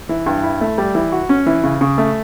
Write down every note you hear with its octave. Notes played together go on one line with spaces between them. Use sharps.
E3
G2
E4
A3
G3
E3
F#4
C#4
E3
C#3
C#3
A3